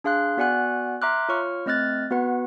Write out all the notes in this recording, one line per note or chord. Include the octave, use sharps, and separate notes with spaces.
D4 G#4 F5 C6 F#6
B3 F#4 D5 F#5 G#5 F#6
E5 A#5 C6 D6 F6 F#6
F4 C#5 C#6 F6
A3 C4 D#5 F6 F#6 A6
B3 F#4 B4 F#5